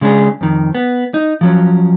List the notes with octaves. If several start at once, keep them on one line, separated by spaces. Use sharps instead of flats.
C#3 G#3 C#4 D4 G#4
F2 D#3
B3
D#4
F3 F#3 C#4